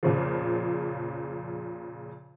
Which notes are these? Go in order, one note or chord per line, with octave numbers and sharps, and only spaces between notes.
F2 A#2 C#3 F3